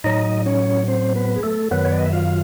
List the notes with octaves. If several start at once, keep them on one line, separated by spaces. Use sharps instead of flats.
A2 F#3 D#4 D#5
C#4 C#5
C4 C5
B3 B4
G#4
A3 A4
F#2 D#3 F#3 B3 B4
C#5
D5
D#5
E5
F4 F5